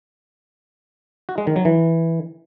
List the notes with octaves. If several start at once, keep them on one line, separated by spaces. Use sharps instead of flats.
F#4
G#3
D#3
F#3
E3